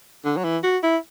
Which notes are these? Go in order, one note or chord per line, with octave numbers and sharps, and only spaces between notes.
D3
F#3
E3
F#4
E4